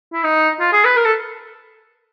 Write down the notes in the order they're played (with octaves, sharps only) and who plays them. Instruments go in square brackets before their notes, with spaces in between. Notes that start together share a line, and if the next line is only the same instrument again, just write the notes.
[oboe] E4
D#4
F4
G#4
B4
A#4
A4